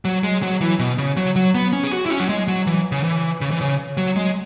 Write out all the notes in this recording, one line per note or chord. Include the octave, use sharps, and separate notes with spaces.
F#3
G#3
F#3
E3
B2
C#3
F#3
F#3
B3
C#4
G#4
F#4
E4
C#4
F#3
G#3
F#3
E3
C#3
E3
C#3
E3
C#3
F#3
G#3